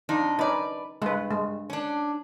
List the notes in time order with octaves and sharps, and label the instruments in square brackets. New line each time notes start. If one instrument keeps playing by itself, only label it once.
[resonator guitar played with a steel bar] F2 D4 D#4
[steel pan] C#4 D#4 [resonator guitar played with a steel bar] B4 D5
[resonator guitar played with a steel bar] G2 [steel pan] G#3 B4
[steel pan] G#3
[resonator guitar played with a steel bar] C#4 D4